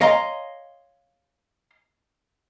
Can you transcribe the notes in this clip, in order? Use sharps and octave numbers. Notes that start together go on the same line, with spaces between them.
C#5 D#5 F5 G#5 A#5 C6